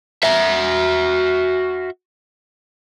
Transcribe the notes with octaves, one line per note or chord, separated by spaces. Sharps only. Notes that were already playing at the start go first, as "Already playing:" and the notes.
F#4 E5